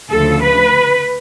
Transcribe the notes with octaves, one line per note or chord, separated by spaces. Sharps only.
D2 C#3 F3 A4
B4